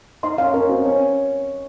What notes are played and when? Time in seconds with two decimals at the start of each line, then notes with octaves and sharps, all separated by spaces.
0.23 D#4 D#5 C6
0.38 C#4 C#5 F5
0.54 C#4 A#4 C#5
0.69 C4 F#4 C5
0.85 C#4 C#5 G#5